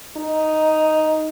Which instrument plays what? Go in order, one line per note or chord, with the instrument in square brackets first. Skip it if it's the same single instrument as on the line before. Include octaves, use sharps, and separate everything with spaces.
[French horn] D#4